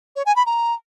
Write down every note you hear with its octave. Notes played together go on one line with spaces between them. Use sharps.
C#5
G#5
B5
A#5